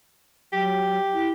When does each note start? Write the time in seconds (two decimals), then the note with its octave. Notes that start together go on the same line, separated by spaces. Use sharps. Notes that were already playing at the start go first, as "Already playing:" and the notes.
0.53 F#3 G4
1.14 E4